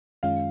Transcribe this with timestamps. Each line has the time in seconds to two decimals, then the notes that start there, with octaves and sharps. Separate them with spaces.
0.23 F#2 D#3 G#3 C#4 F4 F5